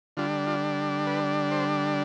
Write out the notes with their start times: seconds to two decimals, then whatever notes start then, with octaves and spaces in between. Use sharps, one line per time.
0.17 D3 G3 D4 F4
0.47 F4
1.06 B4
1.51 C5